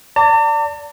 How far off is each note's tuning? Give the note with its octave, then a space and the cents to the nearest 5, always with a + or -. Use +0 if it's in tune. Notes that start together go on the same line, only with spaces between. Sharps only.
D5 -15 A5 +45